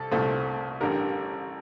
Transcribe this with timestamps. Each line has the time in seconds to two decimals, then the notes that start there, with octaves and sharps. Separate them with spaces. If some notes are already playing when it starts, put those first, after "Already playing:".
Already playing: C2 A4
0.11 C2 A#2 A3 C4
0.80 A1 G2 D3 G3 A#4